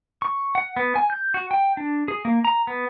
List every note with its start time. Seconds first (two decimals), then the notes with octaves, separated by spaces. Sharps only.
0.22 C#6
0.55 F#5
0.77 B3
0.96 G#5
1.10 G6
1.34 F#4
1.51 G5
1.77 D4
2.08 G#4
2.25 A#3
2.45 A#5
2.67 B3